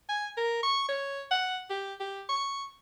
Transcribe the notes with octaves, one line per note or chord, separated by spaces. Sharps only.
G#5
A#4
C#6
C#5
F#5
G4
G4
C#6